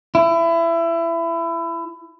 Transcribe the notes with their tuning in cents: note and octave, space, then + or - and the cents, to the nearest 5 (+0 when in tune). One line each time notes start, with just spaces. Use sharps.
E4 +25